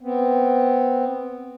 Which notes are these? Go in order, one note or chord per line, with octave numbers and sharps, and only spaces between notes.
B3 C4